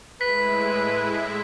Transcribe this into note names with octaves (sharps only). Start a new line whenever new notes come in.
A2 G#3 E4 B4 B6